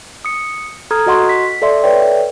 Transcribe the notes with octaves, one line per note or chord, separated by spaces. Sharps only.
D#6 C#7
A4 A#5 D#6 F6 G#6
F#4 D#5 F#5 C6 C#6
B6
A4 D5 E5 C6
A4 B4 C#5 D5 E5 G5